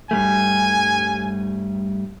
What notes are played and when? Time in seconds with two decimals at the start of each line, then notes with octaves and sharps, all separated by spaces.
0.11 G2 G3 A3 G#5